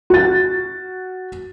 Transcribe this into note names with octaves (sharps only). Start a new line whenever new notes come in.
F#4 A6